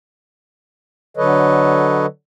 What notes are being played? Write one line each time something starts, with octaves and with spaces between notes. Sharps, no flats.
D3 F#3 A4 B4 C#5 D#5